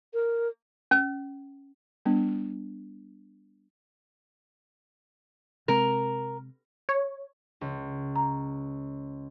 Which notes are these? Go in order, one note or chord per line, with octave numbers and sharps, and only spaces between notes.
A#4
C#4
G3 B3 D4
C3 G#3 C4 A#4
C#5
C#2
A#5